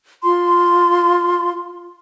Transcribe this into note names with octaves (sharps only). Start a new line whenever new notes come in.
F4 C6